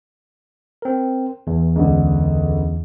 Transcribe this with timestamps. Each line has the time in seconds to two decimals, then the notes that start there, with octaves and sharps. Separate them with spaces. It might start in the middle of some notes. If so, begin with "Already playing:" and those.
0.82 C4 A#4
1.47 E2
1.76 C#2 D3